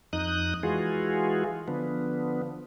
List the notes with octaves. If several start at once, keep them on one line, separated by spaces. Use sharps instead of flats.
F2 D#4 D#6 F#6
E3 G#3 F4 F#4 G#4
D3 F3 B3